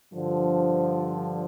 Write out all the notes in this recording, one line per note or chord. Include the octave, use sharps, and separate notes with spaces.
G2 D3 F3